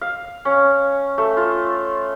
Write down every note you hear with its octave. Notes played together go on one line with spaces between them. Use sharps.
F5
C#4
A3
F4